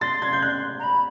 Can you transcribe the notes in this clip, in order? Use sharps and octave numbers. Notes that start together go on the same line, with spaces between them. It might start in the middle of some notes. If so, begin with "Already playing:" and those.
C6 A6
G#6
G6
F#6
A#5
B5